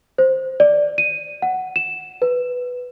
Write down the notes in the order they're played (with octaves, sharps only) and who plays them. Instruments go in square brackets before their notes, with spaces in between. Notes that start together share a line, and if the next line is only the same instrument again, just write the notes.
[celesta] C5
D5
D#7
F#5
E7
B4